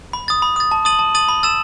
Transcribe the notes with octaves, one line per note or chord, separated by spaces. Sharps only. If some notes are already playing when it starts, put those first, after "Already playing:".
B5
D#6 A6
B5
D#6 A6
A5
D#6 A6 D#7 F#7
A5
D#6 A6 D#7 F#7
B5
E6 A6 E7